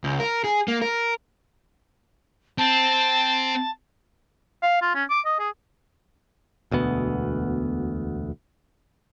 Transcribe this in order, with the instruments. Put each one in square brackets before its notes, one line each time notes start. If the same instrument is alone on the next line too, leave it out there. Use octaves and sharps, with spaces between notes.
[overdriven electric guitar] C#2
A#4
G#4
A#3
A#4
[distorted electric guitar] C4 [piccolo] A5
[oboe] F5
F4
C#4
D6
D#5
G#4
[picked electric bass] E1 D2 B2 B3